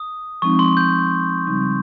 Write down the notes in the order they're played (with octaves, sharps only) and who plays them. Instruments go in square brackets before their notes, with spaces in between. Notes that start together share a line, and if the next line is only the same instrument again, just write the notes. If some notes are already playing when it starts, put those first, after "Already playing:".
Already playing: [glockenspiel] D#6
[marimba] F3 G#3 C4 D#4 [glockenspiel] C#6
[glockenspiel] C6
G6
[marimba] C#3 G3 C4 D#4